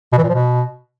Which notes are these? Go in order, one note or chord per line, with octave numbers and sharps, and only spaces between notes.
B2
E3
A#2
F3
B2